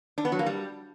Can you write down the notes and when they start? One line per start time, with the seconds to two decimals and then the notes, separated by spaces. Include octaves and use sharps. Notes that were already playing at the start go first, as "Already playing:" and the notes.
0.18 D4
0.25 B3
0.32 F#3
0.39 A#3
0.46 G3